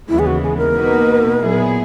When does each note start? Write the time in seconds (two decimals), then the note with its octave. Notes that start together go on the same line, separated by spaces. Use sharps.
0.09 D#2 C#3 E3 G#3 B3 E4
0.19 G#4
0.26 F#4
0.43 G#4
0.57 A#4
0.74 B2 A#3 D#4 F#4 B4
1.39 A#2 F#3 B3 E4 G#4